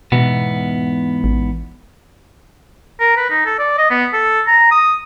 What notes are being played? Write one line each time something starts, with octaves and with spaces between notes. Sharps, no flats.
E2 G#2 B2 B3
A1
A#4
B4
D#4
A4
D5
D#5
B3
A4
A#5
D#6